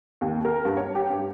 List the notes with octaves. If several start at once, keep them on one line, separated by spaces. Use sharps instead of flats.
D#2
A#4
G2
C#5
G4
G2